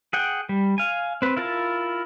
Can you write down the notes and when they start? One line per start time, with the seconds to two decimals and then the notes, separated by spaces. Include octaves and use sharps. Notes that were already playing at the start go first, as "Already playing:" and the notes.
0.13 G#4 F#5 G5
0.49 G3
0.78 F5 G#5
1.22 C4 B4
1.37 E4 F4 A#4 A5